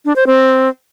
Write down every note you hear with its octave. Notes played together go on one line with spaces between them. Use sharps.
D4
C5
C4